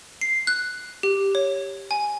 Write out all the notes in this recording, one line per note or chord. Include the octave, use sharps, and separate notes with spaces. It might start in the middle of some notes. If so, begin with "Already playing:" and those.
C7
F#6
G4
C#5
G#5